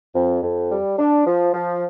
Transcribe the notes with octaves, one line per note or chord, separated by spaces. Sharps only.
F2
F2
G3
D4
F3
F3